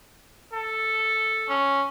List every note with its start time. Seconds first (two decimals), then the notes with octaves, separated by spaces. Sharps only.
0.53 A4
1.49 C#4